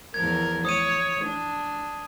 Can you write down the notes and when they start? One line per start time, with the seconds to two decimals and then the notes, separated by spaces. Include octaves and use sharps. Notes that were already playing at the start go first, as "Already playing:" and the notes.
0.14 E2 F3 A#4 G#6
0.65 C#5 D#6 D#7
1.24 D4